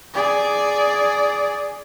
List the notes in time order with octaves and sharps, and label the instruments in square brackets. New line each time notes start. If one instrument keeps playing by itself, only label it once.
[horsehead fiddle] G#4 D5